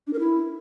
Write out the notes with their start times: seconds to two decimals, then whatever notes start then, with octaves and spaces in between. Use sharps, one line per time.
0.07 D4
0.13 A#4
0.19 E4